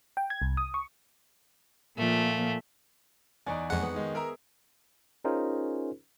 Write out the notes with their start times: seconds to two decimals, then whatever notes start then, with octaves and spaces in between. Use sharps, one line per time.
0.17 G5
0.30 G#6
0.42 C2
0.57 D#6
0.74 C#6
1.98 A#2 F3 A3
3.46 E2 D#4 C#5 D5 F#5 G#5
3.70 F2 G#3 C#5 F#5
3.83 B3
3.94 D#3 G#3
4.15 G#4 A#4 E5 A#5
5.25 C#4 D#4 F4 G#4 A#4 C5